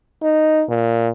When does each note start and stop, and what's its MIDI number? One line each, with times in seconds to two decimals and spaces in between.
0.23 0.62 63
0.69 1.08 46